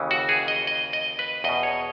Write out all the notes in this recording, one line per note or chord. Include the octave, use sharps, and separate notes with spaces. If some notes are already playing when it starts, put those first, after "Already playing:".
Already playing: D#2 C#3 E3
F#4
G#4
D#5
D#5
D#5
B4
E2 B2 D#5
C#5